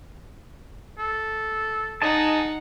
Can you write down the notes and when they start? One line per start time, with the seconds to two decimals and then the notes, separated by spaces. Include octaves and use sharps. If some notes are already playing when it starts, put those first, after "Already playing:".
0.98 A4
2.02 D#4 G#4 D#5 F#5 A5